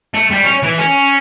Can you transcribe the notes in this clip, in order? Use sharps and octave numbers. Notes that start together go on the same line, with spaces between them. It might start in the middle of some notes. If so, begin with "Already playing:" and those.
A3
G3
C#4
E3
C#4